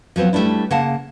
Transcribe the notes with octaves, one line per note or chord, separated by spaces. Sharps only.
F3 F#3 B3 C4
G3 A3 C#4 D4 E4
C#3 A#3 F#5 A5